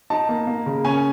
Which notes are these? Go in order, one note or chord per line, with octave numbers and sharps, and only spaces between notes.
D#4 A5
A#3
A#3
C#3
C#4 G#5